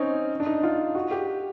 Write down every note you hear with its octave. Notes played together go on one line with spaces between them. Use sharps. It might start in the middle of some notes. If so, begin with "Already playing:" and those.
Already playing: C4 C#4 D#4
D4
D#4
F4
F#4
G4